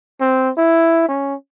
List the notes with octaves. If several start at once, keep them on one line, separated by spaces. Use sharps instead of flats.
C4
E4
C#4